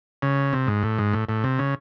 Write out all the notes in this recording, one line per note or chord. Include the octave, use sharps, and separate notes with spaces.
C#3
C3
G#2
A2
G#2
A2
A2
C3
C#3